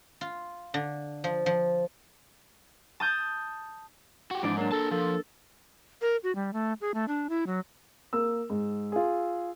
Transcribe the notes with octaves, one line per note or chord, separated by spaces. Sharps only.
F4
D3
F3
F3
A5 D#6 G6
F#4 G4
F2 G#2 E3 D4 D6
F#3 A#3 D4
A4 A#4 A5
F3 A4
A#4
F#4
G3
A3
G#4
A3
D4
E4
F#3
A#3 A#4 E6
G#2
F4 G#4